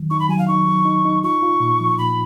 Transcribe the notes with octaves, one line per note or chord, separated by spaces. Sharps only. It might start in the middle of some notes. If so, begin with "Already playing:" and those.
Already playing: D#3 F#3
D#4 C#6
B5
F#3 G#5
F5
D#4 C#6
F#3
D#4
D#4
F4 C#6
F4
A#2
F3
A#2 B5